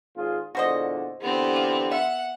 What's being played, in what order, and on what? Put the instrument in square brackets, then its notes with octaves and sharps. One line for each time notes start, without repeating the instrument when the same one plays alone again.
[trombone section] G#1 F4 G#4
[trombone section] E2 A#2 D3 [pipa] F#4 C5 D#5
[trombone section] D3 E3 G4 [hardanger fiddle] B3 C4
[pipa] F4
[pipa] E5 [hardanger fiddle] F#5